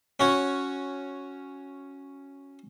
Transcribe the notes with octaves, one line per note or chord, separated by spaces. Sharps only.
C#4 F#4 C#5